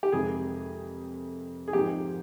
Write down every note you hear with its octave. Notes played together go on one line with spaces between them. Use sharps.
G4
F2 C3 D#3 G#3 G#4
G#4
G#2 F3 C4 D#4 G4 A#4